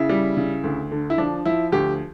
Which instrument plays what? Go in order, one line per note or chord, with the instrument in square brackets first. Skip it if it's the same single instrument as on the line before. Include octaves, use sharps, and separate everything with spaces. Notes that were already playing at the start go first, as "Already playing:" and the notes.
Already playing: [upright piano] C#3 E4
G3
C#3
D2
D3
E4
F3 D4
F3 E4
D2 G4